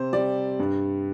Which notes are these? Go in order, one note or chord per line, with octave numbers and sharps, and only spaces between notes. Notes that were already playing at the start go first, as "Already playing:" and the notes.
Already playing: C3 C5
G3 D5
G2